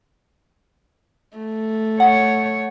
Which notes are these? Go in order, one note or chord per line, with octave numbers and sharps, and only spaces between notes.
A3
C#5 F#5